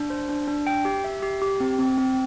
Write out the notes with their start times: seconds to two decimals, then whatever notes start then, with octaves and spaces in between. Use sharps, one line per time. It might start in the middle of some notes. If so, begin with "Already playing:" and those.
Already playing: D4
0.10 C5
0.29 D4
0.48 D4
0.67 G5
0.85 G4
1.04 E5
1.23 G4
1.42 G4
1.60 C4
1.79 C4
1.98 C4